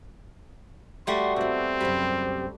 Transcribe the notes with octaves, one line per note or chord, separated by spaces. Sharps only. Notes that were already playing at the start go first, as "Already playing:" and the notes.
G3 A3 F#4 C6
B2 C4 E4
F#2 C3 G3 B4